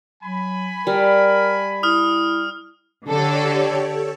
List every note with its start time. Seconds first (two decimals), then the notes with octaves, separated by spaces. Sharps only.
0.23 F#3 G#5 B5
0.87 G3 A#4
1.83 E4 D#6 F6
3.07 D3 G4 A4 C#5 D5
3.83 A4